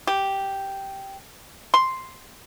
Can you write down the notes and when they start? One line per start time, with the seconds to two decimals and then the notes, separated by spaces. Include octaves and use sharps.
0.07 G4
1.74 C6